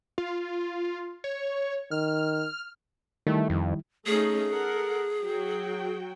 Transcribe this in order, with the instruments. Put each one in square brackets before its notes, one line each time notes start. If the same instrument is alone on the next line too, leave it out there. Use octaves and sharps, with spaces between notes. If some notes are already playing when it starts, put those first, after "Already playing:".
[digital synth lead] F4
C#5
[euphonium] D#3 [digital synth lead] F6
[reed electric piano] D#3 G3 E4 [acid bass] A3
[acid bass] F2
[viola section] A3 C#4 D#4 [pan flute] G#4
[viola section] A4 A#4 F#5
F#3 F#4 G5